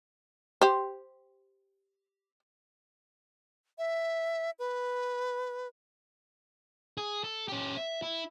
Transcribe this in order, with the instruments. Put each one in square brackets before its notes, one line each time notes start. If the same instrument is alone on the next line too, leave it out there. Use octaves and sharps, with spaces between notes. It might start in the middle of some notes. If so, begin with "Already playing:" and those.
[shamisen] G4 C5
[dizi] E5
B4
[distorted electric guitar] G#4
A4
C#4 G4
E5
E4